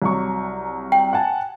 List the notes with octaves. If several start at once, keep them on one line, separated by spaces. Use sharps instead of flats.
C2 F#3 C#6
G5
F#5 G#5 A5